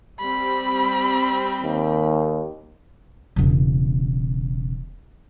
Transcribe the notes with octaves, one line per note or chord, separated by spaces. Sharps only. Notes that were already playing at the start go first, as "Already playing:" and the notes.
G3 C4 B5
D#2
E1 C#3